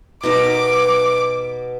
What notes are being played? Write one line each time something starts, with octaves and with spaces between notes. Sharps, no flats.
B2 D#4 A#4 D6